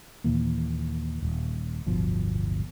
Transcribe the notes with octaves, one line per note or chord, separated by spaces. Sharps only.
D#2 A#2 E3 A#3
D#1
D1 G1 B2 F3